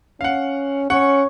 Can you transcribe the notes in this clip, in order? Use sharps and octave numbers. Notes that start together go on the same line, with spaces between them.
C#4 F5 F#5
C#4 C#5 F#5